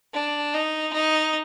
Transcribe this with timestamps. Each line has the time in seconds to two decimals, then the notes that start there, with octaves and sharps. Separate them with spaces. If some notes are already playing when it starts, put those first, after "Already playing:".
0.14 D4
0.54 D#4
0.93 D#4